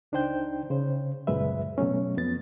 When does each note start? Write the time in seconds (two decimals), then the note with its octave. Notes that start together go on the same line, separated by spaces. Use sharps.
0.12 C#2 D4 D#4 C5 G5 G6
0.70 C#3 C5
1.27 C#2 F#2 A#2 G#3 B4 E5
1.78 B2 F#3 A3 C#4
2.17 F2 B3 A6